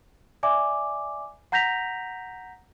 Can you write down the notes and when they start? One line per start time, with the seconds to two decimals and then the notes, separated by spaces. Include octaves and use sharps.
0.43 D5 E5 G#5 D6
1.52 F#5 A#5 G6 A#6 B6 F7